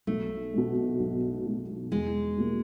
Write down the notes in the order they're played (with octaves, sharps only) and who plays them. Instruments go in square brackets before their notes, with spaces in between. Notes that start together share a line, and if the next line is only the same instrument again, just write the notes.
[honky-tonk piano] B1 [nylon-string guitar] A3
[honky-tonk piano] B2 G#3
B1
B2 G#3
[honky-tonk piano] E2 [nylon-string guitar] G#3
[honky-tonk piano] B2 G3 A#3